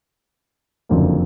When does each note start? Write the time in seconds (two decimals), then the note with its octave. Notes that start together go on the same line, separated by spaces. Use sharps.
0.89 F#1 F2 D3 F#3 A#3